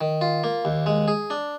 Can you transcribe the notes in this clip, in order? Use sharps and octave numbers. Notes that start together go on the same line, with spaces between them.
D#3
F4
A#3
D#2
G#3
G#4
D4